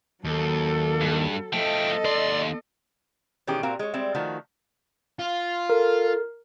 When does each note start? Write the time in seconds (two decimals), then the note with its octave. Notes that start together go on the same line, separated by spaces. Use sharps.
0.24 D#2 F#3 A4
1.01 G2
1.53 F3 A3 A4 D#5 G5
2.05 D#2 D5 C6
3.47 B2 D#3 E3 C#4 G4 G#4
3.63 A#2 C4 F#4 A#4 F5
3.79 G#3 C#5
3.93 G3 G#3 C4 E5
4.15 D#3 F3 A3 F#4
5.19 F4
5.70 A4 A#4